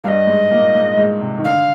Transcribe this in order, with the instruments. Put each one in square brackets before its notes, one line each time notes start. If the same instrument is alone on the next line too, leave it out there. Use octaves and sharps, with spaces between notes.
[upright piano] G2 G3 [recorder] D#5 F5
[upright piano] G#2 G#3
A#2 A#3
G#2 G#3
G#2 G#3
C3
D#3
[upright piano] D3 [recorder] F5